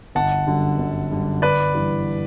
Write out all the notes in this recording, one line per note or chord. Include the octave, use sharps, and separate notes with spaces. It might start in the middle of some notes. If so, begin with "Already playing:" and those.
G1 F#5 A5
F#2 D3 G3
G1
F#2 D3 G3
G1 B4 D5
G2 E3 G3